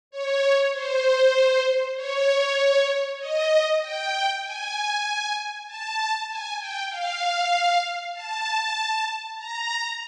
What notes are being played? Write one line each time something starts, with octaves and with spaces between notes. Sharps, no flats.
C#5
C5
C#5
D#5
G5
G#5
A5
G#5
G5
F5
A5
A#5